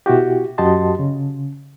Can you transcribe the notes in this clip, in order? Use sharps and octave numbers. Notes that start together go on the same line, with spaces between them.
B2 E4 F#4 G4
F#2 F#4 G4 D#5 A5 C6
C#3